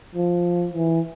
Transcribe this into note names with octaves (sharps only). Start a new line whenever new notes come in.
F3
E3